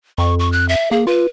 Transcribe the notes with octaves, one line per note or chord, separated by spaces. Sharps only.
F2 C#6
C#6
F#6
E5
A#3 G#4
F4 B4